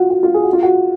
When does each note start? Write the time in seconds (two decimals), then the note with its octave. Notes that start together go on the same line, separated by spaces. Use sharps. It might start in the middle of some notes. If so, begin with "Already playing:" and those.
Already playing: F4 F#4
0.10 F#4
0.23 F4
0.34 G#4
0.43 F#4
0.53 F4
0.63 F#4